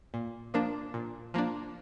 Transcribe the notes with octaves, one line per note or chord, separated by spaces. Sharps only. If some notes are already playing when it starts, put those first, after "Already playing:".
A#2
F3 A#3 D4
A#2
F3 A#3 D4